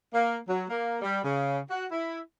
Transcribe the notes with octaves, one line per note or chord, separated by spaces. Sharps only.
A#3
F#3
A#3
G3
C#3
F#4
E4